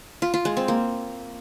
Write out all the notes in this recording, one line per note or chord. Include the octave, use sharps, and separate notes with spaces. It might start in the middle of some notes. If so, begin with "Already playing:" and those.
F4
F4
G#3
C4
A#3